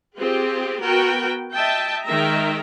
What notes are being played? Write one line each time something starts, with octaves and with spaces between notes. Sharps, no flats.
C4 F4 G4 G#4
B3 F#4 A#4 G5
D#5 E5 G5 A5
D#3 G#3 A#4 E5 G5 A#5